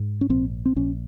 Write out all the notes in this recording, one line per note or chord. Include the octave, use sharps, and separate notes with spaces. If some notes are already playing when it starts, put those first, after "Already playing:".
Already playing: G#2
C#4
A#1 C4
C4
A#1 C#4